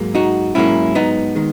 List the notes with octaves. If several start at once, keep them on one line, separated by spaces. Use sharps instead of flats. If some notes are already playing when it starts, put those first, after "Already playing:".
Already playing: G#2 F#3 A#3
D#4 F#4
G#2 F#3 A#3 C#4 E4
B3 D#4
D#3 G#3